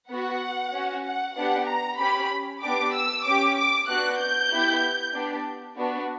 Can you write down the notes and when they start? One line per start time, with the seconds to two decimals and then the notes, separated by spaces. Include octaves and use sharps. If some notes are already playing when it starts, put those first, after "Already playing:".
0.10 B3 F#4 F#5
0.74 C#4 F#4
1.05 F#5
1.36 B3 D4 G4 F#5
1.68 A#5
2.00 C#4 G4 B5
2.62 B3 D4 G4 D6
2.94 E6
3.26 C#4 G4 D6
3.57 D6
3.88 B3 D4 F#4 F#6
4.20 G6
4.51 B3 E4 G4
5.14 B3 D4 G4
5.78 B3 D4 F#4